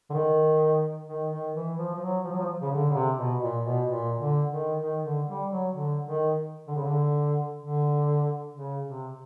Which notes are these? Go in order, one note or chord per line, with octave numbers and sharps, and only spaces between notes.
D3
D#3
D#3
D#3
E3
F3
F3
F#3
F3
F#3
F3
C#3
D3
C#3
C3
B2
A#2
B2
A#2
D3
D#3
D#3
D3
G3
F#3
D3
D#3
D3
C#3
D3
D3
C#3
C3